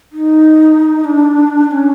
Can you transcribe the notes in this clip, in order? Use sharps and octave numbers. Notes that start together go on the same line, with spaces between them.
D#4
D4
D4
C#4